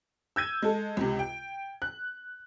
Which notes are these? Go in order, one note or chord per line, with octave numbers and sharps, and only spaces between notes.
E6 G6 G#6 D#7
G#3 A4
C#2 C3
G5
F#6